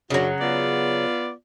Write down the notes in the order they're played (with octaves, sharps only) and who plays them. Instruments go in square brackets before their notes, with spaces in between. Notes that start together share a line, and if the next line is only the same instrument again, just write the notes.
[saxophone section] F#2 D4 F#4 [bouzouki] C#3 F#3
[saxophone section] B3 F4 D5